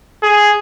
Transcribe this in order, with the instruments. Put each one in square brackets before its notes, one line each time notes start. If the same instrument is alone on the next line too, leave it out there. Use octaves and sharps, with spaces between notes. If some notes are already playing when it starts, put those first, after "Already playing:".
[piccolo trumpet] G#4